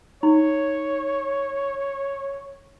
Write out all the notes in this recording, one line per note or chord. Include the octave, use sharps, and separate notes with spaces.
D#4 C#5